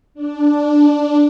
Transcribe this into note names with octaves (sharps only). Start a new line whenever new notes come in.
D4